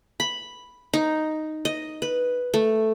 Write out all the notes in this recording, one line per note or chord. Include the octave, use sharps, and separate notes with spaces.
B5
D#4
D#5
B4
A3